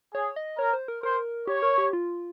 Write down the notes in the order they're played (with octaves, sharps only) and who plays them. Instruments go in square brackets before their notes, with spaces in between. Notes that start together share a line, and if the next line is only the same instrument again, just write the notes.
[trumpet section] G#4 [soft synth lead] C#5
[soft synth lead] D#5
[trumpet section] A#4 [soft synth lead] C#5
[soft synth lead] C5
A#4
[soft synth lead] A#4 [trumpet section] C5
[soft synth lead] G4 [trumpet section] C#5
[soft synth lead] A#4
G4
F4